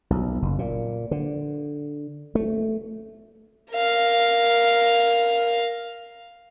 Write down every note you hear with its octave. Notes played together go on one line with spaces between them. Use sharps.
B1
F#1
A#2
D3
A3
A#4 F5